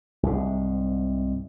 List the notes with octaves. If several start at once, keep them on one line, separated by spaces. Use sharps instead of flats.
C2 G#2